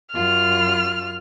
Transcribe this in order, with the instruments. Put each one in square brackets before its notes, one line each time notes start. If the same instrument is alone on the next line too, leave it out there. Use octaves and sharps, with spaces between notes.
[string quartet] F#2 F4 [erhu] F6